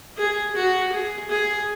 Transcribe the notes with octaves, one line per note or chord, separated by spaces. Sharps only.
G#4
F#4
G#4
G#4